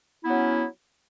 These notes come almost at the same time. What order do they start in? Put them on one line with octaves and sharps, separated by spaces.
E4 B3 F#3 C#4